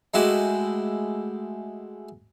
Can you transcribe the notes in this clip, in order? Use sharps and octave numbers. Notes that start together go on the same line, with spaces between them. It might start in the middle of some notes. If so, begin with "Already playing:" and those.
G#3 A3 E4 F#4 G4